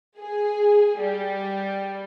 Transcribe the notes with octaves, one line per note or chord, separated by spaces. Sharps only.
G#4
G3